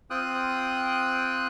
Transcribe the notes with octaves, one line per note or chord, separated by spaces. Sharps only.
C4 F4 G5 D#6 F#6